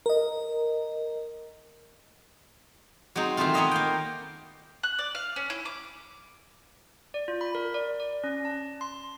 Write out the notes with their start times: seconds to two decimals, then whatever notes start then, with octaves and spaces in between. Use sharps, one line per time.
0.06 A#4 D#5
3.16 F#3 G#3 C4 D#4
3.37 D#3 E3 A3 B3 C4 F4
3.54 A#3 B3 A#4 C#5 D#5 F5
3.71 A#3 G5
4.83 F#6
4.99 D5
5.15 F5
5.36 C#4
5.50 E4
5.65 D6
7.14 D5
7.28 F4
7.41 B5
7.55 A#4
7.74 D5
8.00 D5
8.24 C#4
8.45 A5
8.81 C6